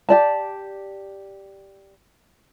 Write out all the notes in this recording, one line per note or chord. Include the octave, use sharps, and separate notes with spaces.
G4 D5 A5